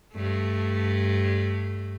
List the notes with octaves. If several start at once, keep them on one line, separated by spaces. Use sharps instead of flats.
G2 A3